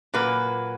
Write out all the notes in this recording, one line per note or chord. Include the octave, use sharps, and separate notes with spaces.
A#2 F#3 A#3 B4